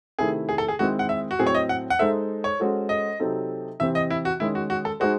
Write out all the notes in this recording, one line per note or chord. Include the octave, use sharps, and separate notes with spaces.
C3 D#3 A3 C4 E4 G#4
G#4
A4
G#4
D#3 G#3 C4 E4 F#4
F#5
E5
F#4
A2 F#3 C4 G#4
C#5
D#5
F#5
F#5
G#3 D#4 A4 C5 E5
C#5
G#3 C#4 F#4 A4 C5
D#5
C3 F#3 C4 D#4 A4
C3 E3 C4 E5
D#5
E4
F#4
D#3 G#3 C#4 E4
F#4
F#4
A4
G#3 D#4 F#4 G#4 C5